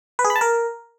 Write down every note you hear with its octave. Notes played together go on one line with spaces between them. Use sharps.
B4
G#4
B5
A5
A#4